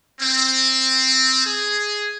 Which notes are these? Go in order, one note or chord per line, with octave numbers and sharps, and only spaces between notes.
C4
G#4